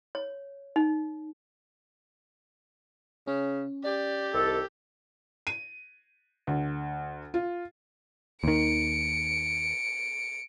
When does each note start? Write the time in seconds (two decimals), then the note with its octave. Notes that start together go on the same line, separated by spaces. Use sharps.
0.15 C#5
0.76 D#4
3.27 C#3 C#4
3.85 G4 D5
4.34 C2 D#3 A4
5.47 D#7
6.47 D2
7.34 F4
8.44 D#2 D#3 C#7 D7